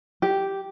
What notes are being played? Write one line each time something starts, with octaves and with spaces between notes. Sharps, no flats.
G4